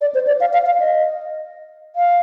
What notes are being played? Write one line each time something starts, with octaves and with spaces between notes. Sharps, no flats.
D5
C5
D5
F5
F5
F5
D#5
F5